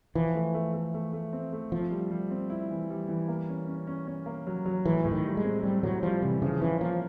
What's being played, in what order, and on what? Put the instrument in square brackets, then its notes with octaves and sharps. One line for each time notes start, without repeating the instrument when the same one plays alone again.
[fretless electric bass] E3 [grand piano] F3
[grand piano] A3
A3
A3
A3
A3
C4
A3
[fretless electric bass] F3 [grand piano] C4
[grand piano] G3
G3
C4
E4
E3
G3
E3
A#3
C#4
C#4
C#4
C#4
A#3
F#3
F#3
[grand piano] A2 [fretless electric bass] E3
[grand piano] A2
[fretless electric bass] D#3
[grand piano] G3
[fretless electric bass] G#3
[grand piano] C4
[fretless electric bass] G3 [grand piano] C4
[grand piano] A2 [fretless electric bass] F#3
[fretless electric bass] F3 [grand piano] G3
[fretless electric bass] C3 [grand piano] E3
[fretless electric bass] C#3 [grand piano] F3
[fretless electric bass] E3 [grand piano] C#4
[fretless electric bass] F3 [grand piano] A#3